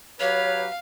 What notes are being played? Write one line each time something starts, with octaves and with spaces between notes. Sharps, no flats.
F#3 G4 B4 C#5 F5